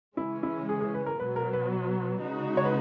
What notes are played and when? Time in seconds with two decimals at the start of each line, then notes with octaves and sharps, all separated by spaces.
0.17 C#3 E3 G#3 C#4 E4
0.43 E4
0.69 G#4
0.81 G#4
0.94 B4
1.06 A#4
1.20 B2 F#3 B3 B4
1.36 A#4
1.53 B4
2.21 C#3 G#3 D#4 F#4
2.57 C#5
2.65 B4